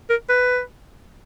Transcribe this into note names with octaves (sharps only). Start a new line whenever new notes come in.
A#4
B4